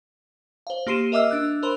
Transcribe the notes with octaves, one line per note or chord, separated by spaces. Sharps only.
C5 F5
A#3 G4 C6 C7 D#7 E7
A#4 D#5 E5 D6 E6 F6
D4 E6 F#6
A#4 C5 B5 C6